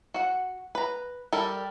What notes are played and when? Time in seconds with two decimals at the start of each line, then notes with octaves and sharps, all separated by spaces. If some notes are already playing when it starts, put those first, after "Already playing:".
0.14 F#4 F#5
0.75 B4 A#5
1.33 G3 A4 A#4